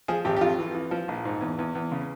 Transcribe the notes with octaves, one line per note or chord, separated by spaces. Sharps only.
F3 G#4
G#1 G4
G4
F2 F4
E3
E3
F3
A#1
G#2
E2
E2
E2
C#3